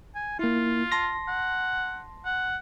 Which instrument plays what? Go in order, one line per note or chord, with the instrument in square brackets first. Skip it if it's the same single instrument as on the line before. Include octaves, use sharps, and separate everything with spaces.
[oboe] G#5
[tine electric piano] A#3 E4 [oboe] F4
[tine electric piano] A5 C6 A#6
[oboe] F#5
F#5